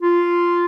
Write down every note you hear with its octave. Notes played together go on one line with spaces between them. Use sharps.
F4